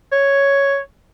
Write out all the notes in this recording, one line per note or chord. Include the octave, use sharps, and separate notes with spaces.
C#5